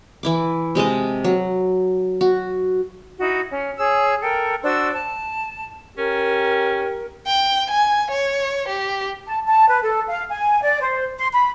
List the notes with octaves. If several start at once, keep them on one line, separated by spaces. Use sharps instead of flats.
E3 E4 D6
C3 G#3 D#5 A5
F#3
F#4
D#4 E4 F#4
C#4
G#4 C#5 E6
A4 A#4 G5
D4 F#4 C5 E6
A5
C#4 G4 A#4
G5
G#5
C#5
G4
A5
A5
B4
A4
F5
G#5
D5
C5
C6
B5